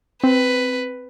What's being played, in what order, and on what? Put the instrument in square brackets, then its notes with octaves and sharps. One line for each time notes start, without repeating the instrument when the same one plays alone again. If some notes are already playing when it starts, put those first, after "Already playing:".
[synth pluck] C4 [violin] B4